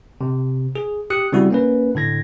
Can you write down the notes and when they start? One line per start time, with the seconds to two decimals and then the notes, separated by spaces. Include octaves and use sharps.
0.21 C3
0.75 G#4
1.10 G4 D#6 F#6 C#7
1.32 C#3 G3 C4 E4 F#4
1.51 A#3 C#4 B4
1.95 A2 D3 G#6 A#6